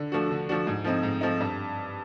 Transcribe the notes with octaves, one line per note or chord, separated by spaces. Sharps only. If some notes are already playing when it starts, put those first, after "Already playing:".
Already playing: D3
F3 A3 D4 F#4
D3
F3 A3 D4 F#4
G#2
F3 A3 C4 D#4
G#2
F3 A3 C4 D#4
G2